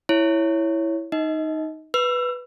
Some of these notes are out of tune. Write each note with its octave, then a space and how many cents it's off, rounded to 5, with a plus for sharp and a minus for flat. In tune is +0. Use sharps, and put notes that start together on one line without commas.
E4 +0 C#5 +0
D#4 +0 D#5 +30
B4 +0 E6 +30